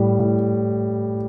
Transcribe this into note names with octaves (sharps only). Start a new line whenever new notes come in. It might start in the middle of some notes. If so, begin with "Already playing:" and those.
Already playing: A2 G3
A2